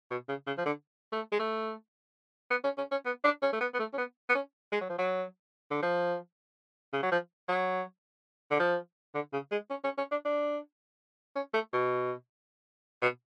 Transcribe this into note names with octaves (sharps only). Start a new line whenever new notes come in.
B2
C#3
C#3
F3
D3
A3
G#3
A3
B3
C#4
C#4
C#4
B3
D4
C#4
A3
B3
B3
A3
C#4
B3
B3
C#4
G#3
F#3
F3
F#3
D3
F3
C#3
F#3
F3
F#3
D3
F3
D3
C#3
G#3
C#4
C#4
C#4
D4
D4
C#4
A3
B2
B2